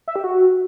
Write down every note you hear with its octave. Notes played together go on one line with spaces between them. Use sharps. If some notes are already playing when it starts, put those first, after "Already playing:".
E5
G4
F#4